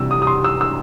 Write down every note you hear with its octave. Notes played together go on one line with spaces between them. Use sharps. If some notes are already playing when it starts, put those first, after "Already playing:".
Already playing: C3 E3 G3 E6
D#6
D#6
C6
E6
E6